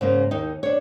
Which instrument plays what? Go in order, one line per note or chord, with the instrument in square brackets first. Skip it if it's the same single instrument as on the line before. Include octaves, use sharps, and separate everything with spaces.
[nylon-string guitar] G#2 C#3 A#3
D#2 D#4
D4 C#5